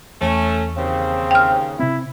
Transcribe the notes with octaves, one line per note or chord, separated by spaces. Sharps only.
E2 A3 C#4
D#2 C#3 C4
G5 F6
C3 C4 E4